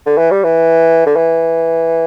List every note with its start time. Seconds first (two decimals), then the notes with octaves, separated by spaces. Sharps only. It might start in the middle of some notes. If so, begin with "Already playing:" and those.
0.06 D3
0.18 E3
0.31 G3
0.44 E3
1.06 D3
1.16 E3